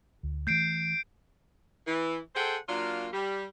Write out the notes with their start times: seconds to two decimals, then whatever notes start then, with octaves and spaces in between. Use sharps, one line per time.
0.23 D2
0.47 E3 A3 G6 C7 D7
1.87 E3
2.35 G#4 A4 C5 F#5 G5
2.68 F#3 A#3 D4 F4
3.12 G3